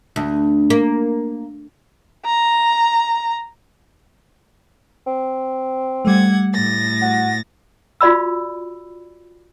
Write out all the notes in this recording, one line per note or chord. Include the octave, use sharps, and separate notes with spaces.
D2
A#3
A#5
C4
G3 A3 F#5 G#6
A2 A6 A#6
F#4
F4 F#4 D5 B5 E6